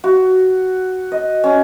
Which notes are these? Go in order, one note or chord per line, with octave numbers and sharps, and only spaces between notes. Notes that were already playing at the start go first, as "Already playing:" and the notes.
F#4
D#5
C#4